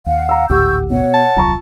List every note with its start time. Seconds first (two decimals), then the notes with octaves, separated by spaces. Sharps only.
0.06 D#2 F5 F#5
0.29 A#5 E6
0.50 G#1 D2 A2 G4 F#5 C#6 E6 G6
0.90 B2 C#5 F#5
1.14 A5
1.36 D#1 C2 F#3 F4 A#5 C#6